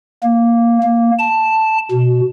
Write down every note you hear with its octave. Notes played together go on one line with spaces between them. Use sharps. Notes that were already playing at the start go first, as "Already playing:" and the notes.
A#3
A#3
A5
B2